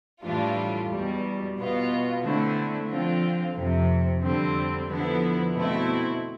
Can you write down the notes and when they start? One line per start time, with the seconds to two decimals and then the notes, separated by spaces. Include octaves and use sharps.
0.23 A2 E3 G3 D4 F4
0.89 E2 B2 G3
1.56 B2 B3 F4
2.21 D3 A3 C4 E4
2.88 D3 F3 C4 F4
3.55 F2 C3 F3
4.21 F2 D3 G3 C4
4.87 D3 F3 B3 E4
5.53 B2 A3 C4 E4